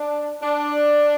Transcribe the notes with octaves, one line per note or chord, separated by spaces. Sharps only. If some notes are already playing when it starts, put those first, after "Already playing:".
Already playing: D4
D4